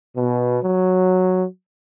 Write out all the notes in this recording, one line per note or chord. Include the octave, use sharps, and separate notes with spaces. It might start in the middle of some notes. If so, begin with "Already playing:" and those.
B2
F#3